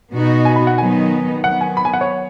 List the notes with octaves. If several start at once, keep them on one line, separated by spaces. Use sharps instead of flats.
B2 B3 D#4 F#4
G#5
B5
F#5
D#3 F#3 B3 D#4 G#5
D#3 F#3 B3 F#5
G#5
B5
G#5
F#5
C#5